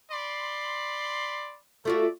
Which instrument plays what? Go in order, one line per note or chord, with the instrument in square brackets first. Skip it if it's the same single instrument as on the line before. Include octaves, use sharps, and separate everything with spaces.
[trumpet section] D5 B5 C6
[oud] A3 F4 F#4 [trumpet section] A4 D5 E5